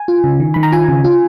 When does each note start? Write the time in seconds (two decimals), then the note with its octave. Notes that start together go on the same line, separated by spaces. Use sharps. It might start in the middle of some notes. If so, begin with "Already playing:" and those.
Already playing: G#5
0.08 F4
0.24 C#3
0.40 D#3
0.54 D#3 B5
0.63 A#5
0.72 F4 G#5
0.88 C#3
1.04 F4